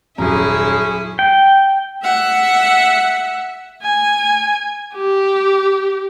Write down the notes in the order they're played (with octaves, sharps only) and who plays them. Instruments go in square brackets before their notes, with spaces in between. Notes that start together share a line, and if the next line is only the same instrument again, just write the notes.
[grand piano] D#1 A#5 [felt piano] F#2 [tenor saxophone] C#4 [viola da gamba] E4 G#4
[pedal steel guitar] G5
[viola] E5 F#5
G#5
G4